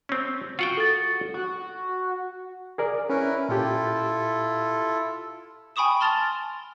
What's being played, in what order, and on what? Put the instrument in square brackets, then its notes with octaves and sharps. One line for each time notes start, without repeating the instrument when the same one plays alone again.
[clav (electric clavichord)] C4 C#4
[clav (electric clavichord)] F4 F#5 G5 [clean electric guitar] F#4
[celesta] A4 A6
[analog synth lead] F#4
[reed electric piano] G#4 A#4 D5
[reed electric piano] C#4 [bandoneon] E4 A#4 B4
[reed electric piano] A#2 G4 [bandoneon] E4 F4 A4
[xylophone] G5 G#5 B5 C#6 D#6 E7
A5 C6 F6 A6 F7 G7